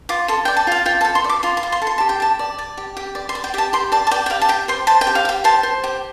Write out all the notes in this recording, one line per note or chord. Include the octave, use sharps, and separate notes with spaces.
F4 D6
A4 C6
D5 G5
A5
F4 F5
F4 G5
A5
A4
C6
D5
D6
F4 C6
C6
F4
C6
A4
C6
G4 A5
G5
G4 A5
D5
D5
G4
G4
D5
C6
D5
G5
G4 A5
G4 C6
D5 A5
A5
D5 G5
G5
G4 F5
A5
G4 G5
C5 C6
C5 A5
G5
G4
F5
G4 G5
C5 A5
C5
G4